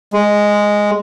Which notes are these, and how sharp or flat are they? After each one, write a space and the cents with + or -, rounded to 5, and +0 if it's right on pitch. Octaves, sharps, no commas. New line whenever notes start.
G#3 -5